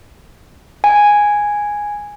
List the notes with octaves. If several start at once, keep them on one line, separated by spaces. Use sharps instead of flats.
G#5